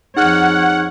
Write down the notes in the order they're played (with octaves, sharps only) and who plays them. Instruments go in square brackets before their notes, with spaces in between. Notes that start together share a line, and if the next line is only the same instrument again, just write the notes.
[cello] F2 C#5 [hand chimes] D#4 G#4 F6 [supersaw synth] F#5